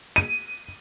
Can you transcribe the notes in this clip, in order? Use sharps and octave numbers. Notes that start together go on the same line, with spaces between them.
D#7